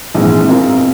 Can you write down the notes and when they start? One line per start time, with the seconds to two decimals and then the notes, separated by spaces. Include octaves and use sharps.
0.14 A#1 G#2 E3 G#3 C4
0.48 B2 G#3 C4 F4 A#4